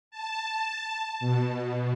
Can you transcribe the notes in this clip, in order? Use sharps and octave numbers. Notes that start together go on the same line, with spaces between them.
A5
B2